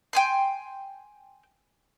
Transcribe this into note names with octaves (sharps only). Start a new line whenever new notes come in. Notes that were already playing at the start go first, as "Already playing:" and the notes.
G5 G#5 C6